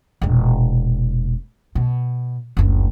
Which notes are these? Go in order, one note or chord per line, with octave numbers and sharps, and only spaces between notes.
E1 A#2
B2
F#1 D2